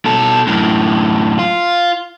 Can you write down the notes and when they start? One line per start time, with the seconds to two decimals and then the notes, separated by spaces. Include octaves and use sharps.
0.06 B2 A4
0.47 F#2 A2
1.39 F4